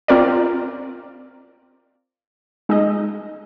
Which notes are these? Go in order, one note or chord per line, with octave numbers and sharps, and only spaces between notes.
C4 F4 A#4 D5
G#3 D#4 G#4 D#5